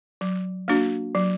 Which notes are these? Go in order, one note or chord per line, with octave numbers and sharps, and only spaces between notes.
F#3
A#3 D4 F#4
F#3